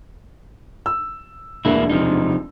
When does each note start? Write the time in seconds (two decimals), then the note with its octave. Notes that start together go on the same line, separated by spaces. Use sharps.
0.86 E6
1.65 E1 D2 E3 A#3 E4
1.90 C3 F3 D#4